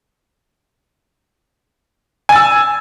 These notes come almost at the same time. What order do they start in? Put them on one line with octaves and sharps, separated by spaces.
G#5 A6 E6